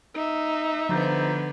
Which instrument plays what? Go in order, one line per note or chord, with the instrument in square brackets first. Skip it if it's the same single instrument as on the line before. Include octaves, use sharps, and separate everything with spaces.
[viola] D#4 E5
[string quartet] D3 B3 [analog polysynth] F3 A#5 G6